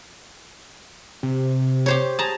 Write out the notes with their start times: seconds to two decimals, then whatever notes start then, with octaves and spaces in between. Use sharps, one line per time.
1.23 C3
1.86 G4 C5 C#5
2.19 G#4 A5 A#5